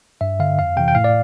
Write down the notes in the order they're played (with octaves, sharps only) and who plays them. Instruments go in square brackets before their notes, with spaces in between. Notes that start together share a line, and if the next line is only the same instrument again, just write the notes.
[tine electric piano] G2 E5
D3 F5
F2 F5
C3 E3 G5
G5
A2 F5
D5